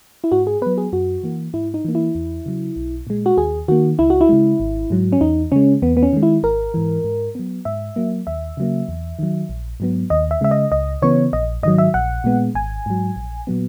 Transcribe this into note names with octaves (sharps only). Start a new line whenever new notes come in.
E4
G#2 F#4
G#4
F#3 B3 B4
G#4
F#2 F#4
E3 A#3
G#2 E4
D#4
E3 A#3
E4
E2
C#3 F#3
B1
A#2 G#3
F#4
D#2 G#4
D#3 A#3 F#4
C#2 E4
F#4
E4
C#3 G#3
G#1
G#2 F#3
C#4
E2 D#4
C#3 G#3 C#4
E2 B3
B3
C#4
D#3 G#3
E4
G#1 A#4
G#2 E3
G#2
F#3 B3
G#2 E5
F#3 A#3
D#2 E5
C#3 F#3 A#3
E2
D#3 F#3
A#1
G#2 F#3 B3
D#2 D#5
E5
C#3 G#3 E5
D#5
C#2 D#5
C#3 E3 B3 C#5
A#1 D#5
G#2 D#3 F#3 D#5
E5
A#1 F#5
A#2 G#3 B3
G#1 G#5
G#2 F#3
A#1
A#2 F#3 B3